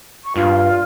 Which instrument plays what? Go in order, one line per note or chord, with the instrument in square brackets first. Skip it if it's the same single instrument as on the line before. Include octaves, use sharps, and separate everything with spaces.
[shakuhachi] C#6
[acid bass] G2 [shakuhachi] F4